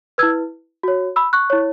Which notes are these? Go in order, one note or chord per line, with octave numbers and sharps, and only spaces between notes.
E4 B4 E6 G#6
F#4 C#5
B5 E6
C#6 F#6
E4 C#5